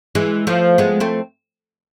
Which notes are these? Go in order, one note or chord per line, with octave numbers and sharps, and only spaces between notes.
E3 G#3
F3 A3
G#3 B3
A3 C4